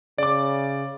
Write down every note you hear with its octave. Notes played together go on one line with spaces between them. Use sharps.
C#3 D5 D6